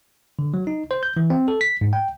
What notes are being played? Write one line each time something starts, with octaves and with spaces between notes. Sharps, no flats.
D3
F#3
D#4
C5
G6
E3
C4
A4
B6
G#2
G5